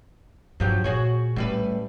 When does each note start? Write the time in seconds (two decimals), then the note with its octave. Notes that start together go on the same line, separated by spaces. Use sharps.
0.60 G2 F3 F#3 G4
0.84 A#2 F#4 G#4 C#5
1.36 A2 G3 C#4 B4